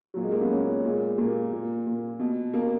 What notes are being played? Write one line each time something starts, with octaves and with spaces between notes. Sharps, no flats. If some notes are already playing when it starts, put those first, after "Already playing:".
A#2 F#3
G#3
A#3
B3
A#2 C#4
A#2 G#3
A#2 A#3
A#2
A#2
B2
B2 A#3